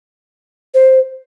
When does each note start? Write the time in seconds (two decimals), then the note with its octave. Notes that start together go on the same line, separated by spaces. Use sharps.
0.74 C5